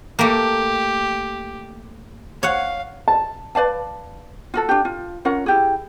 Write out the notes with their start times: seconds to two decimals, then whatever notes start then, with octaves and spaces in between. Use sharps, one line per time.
0.19 A3 A#3 G4
2.43 C#5 F5 F#5
3.08 A5
3.55 B4 D5 F5 A5
4.54 F4 F#4 A4
4.69 D4 G4
4.85 F4
5.25 C#4 F4 A#4 F#5
5.46 E4 G4 G#4